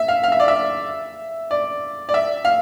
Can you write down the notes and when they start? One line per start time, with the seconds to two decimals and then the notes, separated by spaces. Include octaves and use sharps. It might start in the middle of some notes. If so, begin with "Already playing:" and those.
Already playing: E5
0.08 F5
0.24 F5
0.32 E5
0.40 D5
0.48 E5
1.51 D5
2.09 D5
2.14 E5
2.45 F5